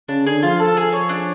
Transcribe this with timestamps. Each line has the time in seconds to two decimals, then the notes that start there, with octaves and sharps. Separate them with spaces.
0.09 C#3 D4
0.26 D3 G#4
0.43 F3 F4
0.60 A4
0.77 G#4
0.92 C#5
1.09 D4